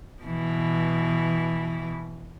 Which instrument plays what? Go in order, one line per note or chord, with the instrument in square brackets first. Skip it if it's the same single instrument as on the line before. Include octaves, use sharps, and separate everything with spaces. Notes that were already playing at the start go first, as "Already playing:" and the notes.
[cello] B2 E3